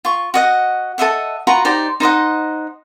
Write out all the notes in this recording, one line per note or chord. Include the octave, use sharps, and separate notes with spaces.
F4 C#6
F#4 D#5 F#5
A4 D#5 E5 F#5
F4 F#4 B4 A#5
D#4 G4 C5 D5
D#4 C5 D#5 F#5